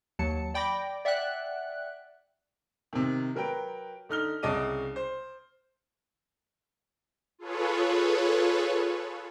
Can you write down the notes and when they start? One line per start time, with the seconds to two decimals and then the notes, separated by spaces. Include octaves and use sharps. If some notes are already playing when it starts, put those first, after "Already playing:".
0.19 D#2 F#3 A5 C#7
0.54 D5 G5 B5 D6 A#6
1.05 D5 E5 F#5 G5 F#6
2.93 C3 D#3
3.35 F#3 A#4 B4 G5
4.09 D3 D#4 F6 G7
4.43 C2 C#3 D#5 A5 D6 D#7
4.96 C5
7.38 F4 G#4 A4 B4 C#5